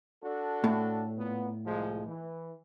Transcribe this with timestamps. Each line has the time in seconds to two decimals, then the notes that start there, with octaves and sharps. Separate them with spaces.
0.23 D4 F#4 A4
0.64 A2
1.17 A#2 B3
1.65 C2 F3 G#3
2.06 E3